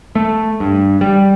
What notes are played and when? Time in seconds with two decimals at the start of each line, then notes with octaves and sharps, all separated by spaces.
0.15 A3
0.60 G2
1.01 G3